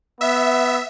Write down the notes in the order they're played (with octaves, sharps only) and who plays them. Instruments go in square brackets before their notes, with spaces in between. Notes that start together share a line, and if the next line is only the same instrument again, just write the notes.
[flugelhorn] B3 [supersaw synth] E5